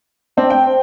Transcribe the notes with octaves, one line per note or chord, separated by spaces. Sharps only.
C4 D4
G5
C4